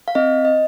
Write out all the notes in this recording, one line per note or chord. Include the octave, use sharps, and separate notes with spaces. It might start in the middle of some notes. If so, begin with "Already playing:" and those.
F5
C4 D#5
D#5